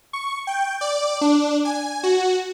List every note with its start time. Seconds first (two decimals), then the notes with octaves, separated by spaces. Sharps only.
0.13 C#6
0.47 G5
0.81 D5
1.21 D4
1.65 G#5
2.03 F#4